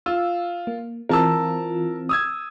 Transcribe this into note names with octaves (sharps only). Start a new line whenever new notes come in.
F4 E6
A#3
E3 C4 F4 A#4 A5 E6
D#6 E6 G#6